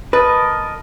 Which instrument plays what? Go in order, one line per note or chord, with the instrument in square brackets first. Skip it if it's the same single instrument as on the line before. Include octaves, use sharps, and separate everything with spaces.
[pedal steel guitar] A#4 D#5 A5 [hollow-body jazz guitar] B4